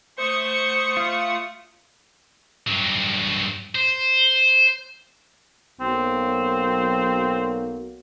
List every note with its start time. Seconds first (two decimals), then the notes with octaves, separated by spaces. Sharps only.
0.18 A3 C5 F#5 C#6 D#6
0.97 F4
2.67 G2 F#3
3.75 C5
5.81 B1 F#3 A#3 C4